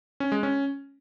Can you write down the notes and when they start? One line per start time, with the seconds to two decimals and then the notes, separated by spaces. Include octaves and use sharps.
0.20 C#4
0.32 G#3
0.43 C#4